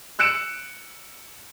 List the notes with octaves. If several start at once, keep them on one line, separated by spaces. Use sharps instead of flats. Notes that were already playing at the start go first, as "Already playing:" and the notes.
E6 F#6 C#7 D7 E7